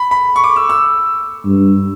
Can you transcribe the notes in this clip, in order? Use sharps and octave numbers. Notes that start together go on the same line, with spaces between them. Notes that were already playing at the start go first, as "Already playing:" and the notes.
Already playing: B5
B5
C#6
D6
E6
E6
G2